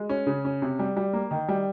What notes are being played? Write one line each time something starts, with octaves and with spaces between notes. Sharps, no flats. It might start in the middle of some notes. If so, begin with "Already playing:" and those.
Already playing: G#3
C#4
C#3
C#4
C3
G3
G3
A#3
D#3
G3